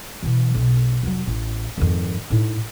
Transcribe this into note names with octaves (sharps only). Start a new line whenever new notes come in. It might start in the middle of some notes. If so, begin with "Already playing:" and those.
B2 E3
B1
F1 F#3
A1
G#1 F2
A2 D#4